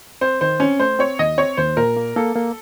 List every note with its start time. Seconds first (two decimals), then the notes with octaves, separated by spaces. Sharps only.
0.21 C4 C5
0.41 D#3 C5
0.60 C4 C#4
0.80 A3 C5
0.99 C4 C#5
1.19 D#2 D#5
1.38 C4 C#5
1.57 D#2 C5
1.77 A#2 A#4
1.97 A#3
2.16 A#3 A4
2.36 A#3